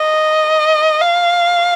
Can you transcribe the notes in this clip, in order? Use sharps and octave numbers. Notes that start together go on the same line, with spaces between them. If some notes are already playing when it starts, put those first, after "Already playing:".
Already playing: D#5
F5